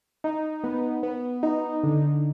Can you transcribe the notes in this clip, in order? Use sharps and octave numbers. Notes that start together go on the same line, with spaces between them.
D#4
B3
B3
D#4
D3